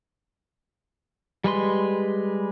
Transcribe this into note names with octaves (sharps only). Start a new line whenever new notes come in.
G3 G#3 B4 C6